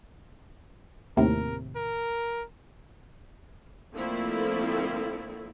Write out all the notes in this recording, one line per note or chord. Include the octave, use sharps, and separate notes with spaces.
D#2 A2 C3 A#4
A#4
D3 F3 A3 A#3 C4 E4